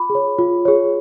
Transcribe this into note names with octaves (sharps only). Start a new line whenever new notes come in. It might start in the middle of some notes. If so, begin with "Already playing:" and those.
Already playing: F4 B5 D6
G#4
C#5
F4
G#4 C#5